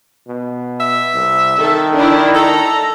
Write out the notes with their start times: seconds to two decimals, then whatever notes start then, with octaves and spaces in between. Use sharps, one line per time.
0.28 B2
0.80 E5
1.14 C2
1.59 D#3 A4
1.94 D4 E4
2.35 A4 A#5